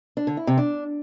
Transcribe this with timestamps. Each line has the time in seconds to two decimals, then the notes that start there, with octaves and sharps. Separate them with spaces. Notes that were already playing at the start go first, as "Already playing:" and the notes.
0.17 D4
0.27 D3
0.37 E4
0.47 C3
0.58 D4